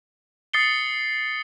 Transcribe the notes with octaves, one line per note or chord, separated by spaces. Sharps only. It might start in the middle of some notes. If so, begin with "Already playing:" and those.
D#6 A6 C7 C#7 G7